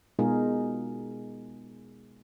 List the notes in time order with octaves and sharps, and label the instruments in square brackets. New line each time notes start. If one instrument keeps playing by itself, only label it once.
[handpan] B2 G#3 D#4 F4 G#4 A#4